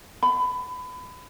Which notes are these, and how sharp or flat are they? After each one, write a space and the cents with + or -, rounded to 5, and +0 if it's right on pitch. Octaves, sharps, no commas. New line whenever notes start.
B5 +25